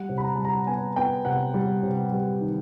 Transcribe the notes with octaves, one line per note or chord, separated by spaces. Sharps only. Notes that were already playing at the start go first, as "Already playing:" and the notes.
Already playing: G3 F#5
C3
B5
A#5
G3 A5
A#5
B3 G#5
B3 G5
C3 F#5
G3
C3
G3
D#3